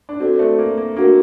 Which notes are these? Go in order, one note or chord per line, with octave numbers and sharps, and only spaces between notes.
D4
C4 F#4 A4 D5
A3
A#3
A#3
A#3 D4 F#4 A#4